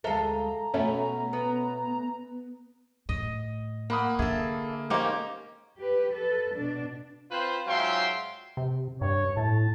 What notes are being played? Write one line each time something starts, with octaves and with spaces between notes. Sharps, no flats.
D2 G#3 A4 E5 F5 A#5
B2 A3 C#4
B3
A2 D#5
A#3 F#5 B5 D#6
D3 G#4 A4 E5
A#3 C#4 D#4 G4 C5
G4 B4
A4 B4
B2 D4
C4 F4 B4 C5
G#2 F#3 F4 E5 G5 C6
C3
G2 C#5
A2 A5